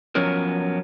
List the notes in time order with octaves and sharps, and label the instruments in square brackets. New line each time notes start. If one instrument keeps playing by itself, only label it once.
[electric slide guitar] F3 F#3 B3 C#4 A#4